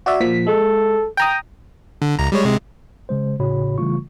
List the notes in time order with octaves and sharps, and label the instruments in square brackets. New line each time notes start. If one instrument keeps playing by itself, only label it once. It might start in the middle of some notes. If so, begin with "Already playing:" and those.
[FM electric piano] F#4 D5 E5
A#2 F3 B6
[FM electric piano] G#3 [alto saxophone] A4
[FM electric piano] G5 A#5 D#6
[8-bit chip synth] D3
C#2 A#5
G3 G#3 C#5
C3 G#3
[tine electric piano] C#3 G#3 C5
G#1 A2 C#3 F#4 C#5 B5
C#3 E3 G3 A3 F4 C#6